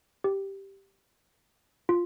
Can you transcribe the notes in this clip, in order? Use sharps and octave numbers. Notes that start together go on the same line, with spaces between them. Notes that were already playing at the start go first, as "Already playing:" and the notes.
G4
F4